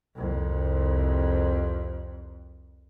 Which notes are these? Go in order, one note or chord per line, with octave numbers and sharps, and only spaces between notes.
C2 F2